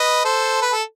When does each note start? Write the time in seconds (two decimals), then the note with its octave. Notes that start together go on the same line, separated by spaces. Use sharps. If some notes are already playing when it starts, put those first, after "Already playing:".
Already playing: B4 D#5
0.24 A4 C5
0.62 B4
0.72 A4